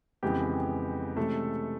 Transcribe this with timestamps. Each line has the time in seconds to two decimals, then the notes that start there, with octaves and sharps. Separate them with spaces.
0.23 F2 C#3 E3 G#3 B3 G4
1.17 C3 E3 G#3 A3 C#4 A4